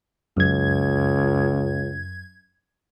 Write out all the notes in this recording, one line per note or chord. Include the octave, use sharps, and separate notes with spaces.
C#2 F#2 G#6